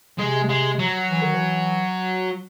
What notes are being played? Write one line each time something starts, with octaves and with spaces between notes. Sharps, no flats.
C3 G#3
G#3
F#3
E3
D#3
E3